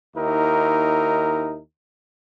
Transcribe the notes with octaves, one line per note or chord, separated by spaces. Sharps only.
D#2 D#4 E4 A#4